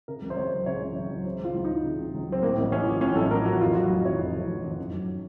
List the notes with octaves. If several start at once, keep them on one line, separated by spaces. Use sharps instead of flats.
C#3 A#4
C#2
C5
C#2 C#5
F#3
C#3 C#5
C#2
C#2 C#5
F#3
C#3 C5
C#2 F4
C#2
F#3 D#4
C#3
C#2
C#2
F#3 C4
A2 A#3
A1
A1 C#4
F3
A2 C#4
A1 A4
A1 A#4
F3 F#4
F2 F4
F#3 F#4
F1 F#4
D#3 C#5
F2
F#3
F1
D#3
F#2
F#3